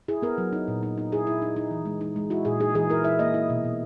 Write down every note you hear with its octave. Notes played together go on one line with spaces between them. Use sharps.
E4 G#4
B3 A#4
F#3
D#4
A#2
D#4
D#4
E4 G#4
E4
D#4
D#4
E3
G#3
D#4
G#3
E4 F#4
A#2 G#4
D#4 G#4
E3 G#4
E4 A#4
E4 E5
A#3 D#5
E4
B2
B2